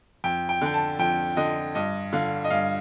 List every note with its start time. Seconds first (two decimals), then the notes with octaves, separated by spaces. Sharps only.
0.24 F2 G5
0.49 G5
0.62 D3 G5
0.74 A5
0.99 F2 G5
1.37 D3 D#5
1.75 G2 D#5
2.13 D3 F5
2.44 D#5
2.50 G2 F5